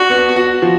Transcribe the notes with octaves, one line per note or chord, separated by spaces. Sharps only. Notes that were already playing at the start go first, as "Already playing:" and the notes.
Already playing: D4 F#4
B3
F#4
F3